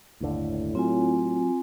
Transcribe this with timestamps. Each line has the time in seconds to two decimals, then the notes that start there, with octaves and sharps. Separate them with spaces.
0.21 G1 D#2 A2 D3
0.75 F#3 C4 F4 G#5